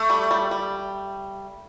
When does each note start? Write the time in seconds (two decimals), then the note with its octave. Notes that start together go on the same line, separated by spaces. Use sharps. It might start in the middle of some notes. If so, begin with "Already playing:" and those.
Already playing: A3
0.10 G3
0.31 G3
0.51 G3